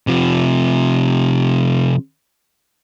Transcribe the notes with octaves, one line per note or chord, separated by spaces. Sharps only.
C3 F3